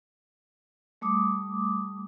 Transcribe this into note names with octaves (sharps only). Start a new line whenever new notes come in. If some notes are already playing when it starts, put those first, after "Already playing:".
G3 A3 D6 D#6